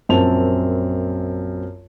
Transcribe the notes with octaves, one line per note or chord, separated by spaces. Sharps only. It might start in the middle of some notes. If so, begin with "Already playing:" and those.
A#1 F#2 A#3 C4 A5 F7